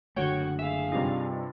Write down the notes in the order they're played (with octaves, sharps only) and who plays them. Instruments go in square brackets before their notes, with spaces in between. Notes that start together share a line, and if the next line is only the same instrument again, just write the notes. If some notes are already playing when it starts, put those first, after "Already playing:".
[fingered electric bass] F#1 D3 A3 [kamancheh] F#4 [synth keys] C#5 G5
[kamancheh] G#4 F5 [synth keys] E5
[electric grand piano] G2 C3 F4 [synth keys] G3 D#4